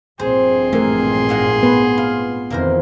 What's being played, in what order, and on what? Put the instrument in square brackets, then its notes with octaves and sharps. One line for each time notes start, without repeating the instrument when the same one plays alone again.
[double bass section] A#1 G2 C4 [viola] G#4 C6 [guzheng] C5
[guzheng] E3 [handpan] A3 A#4
[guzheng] G#2 A#3 F#5
[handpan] B3 B4
[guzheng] F4
[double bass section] F2 D#3 E3 [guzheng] A#3 A#4 C5